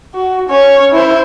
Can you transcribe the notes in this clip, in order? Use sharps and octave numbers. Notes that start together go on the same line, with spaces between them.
F#4
C#4 C#5
E4 C5